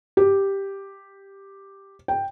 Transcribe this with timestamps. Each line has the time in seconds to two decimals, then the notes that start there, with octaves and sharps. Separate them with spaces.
0.17 G4
2.08 G5